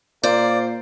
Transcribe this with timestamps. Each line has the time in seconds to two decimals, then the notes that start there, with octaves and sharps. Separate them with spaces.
0.23 A#2 A#3 C5 D5